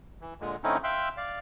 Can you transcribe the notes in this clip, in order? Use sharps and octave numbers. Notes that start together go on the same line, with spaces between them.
E3
A#2 D3 G#3
D3 A3 C4 C#4 D#4 E4
E5 F5 G5 C6 E6 F#6
D5 F5